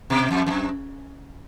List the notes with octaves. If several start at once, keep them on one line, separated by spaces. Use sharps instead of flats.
B2
F2
F2
F#2